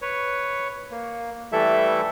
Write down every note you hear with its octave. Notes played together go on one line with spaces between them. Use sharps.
B4 C#5
A#3
E3 G3 A3 E4 A4 E5